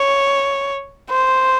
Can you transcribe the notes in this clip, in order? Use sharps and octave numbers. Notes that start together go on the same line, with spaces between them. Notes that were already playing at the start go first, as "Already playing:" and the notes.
Already playing: C#5
C5